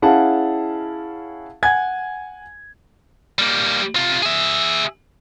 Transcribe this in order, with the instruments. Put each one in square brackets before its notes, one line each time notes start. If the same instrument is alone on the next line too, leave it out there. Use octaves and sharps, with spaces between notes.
[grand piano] C#4 E4 G#4 F5 F#5 A5
F#5 G#5 G#6
[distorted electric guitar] G3 A#3
C3 F4
G#4 E5